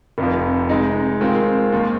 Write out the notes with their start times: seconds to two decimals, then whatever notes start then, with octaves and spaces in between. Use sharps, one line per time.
0.18 F1 F2 C3 F3
0.69 C3 G#3 D#4
1.21 D#3 G#3 C4 F4
1.72 D#2 D#3 C4